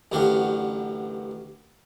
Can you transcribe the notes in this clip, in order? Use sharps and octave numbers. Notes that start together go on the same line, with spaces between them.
A1 F#2 D3 F#4 G4 F5